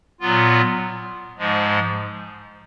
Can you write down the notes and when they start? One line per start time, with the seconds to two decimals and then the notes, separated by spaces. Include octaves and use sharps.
0.21 A#2 F#3 B3 F4
1.38 G#2 F3 G#3